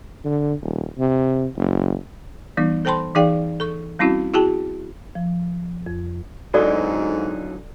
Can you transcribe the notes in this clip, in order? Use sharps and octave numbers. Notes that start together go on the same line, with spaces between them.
D3
D#1
C3
F#1
E3 G3 B3 D#4
A4 C5 G5 A5 B5 C6
E3 D#4 G#4 D5 F5 G5
A4 C#6
G3 C4 C#4 E4 F#4
E4 F#4 G#4 G5 A5
F3
F2
G#2 D3 F#3 D#4 F#4 A4 D5